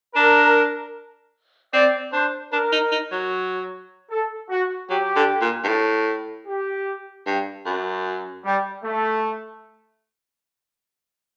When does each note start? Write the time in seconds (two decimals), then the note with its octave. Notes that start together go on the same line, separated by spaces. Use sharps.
0.15 D4 A#4
1.73 C4 D5
2.12 D4 C5
2.52 D4 A#4
2.72 D#4
2.92 D#4
3.11 F#3
4.10 A4
4.49 F#4
4.90 F#3 G4
5.16 D3
5.41 A#2
5.64 G2
5.68 A2
6.47 G4
7.26 G2
7.66 F#2
8.45 G3
8.84 A3